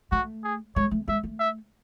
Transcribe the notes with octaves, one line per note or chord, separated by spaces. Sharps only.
A3 F#4
G#4
G#3 C#5
A3
G#3 E5
A3
E5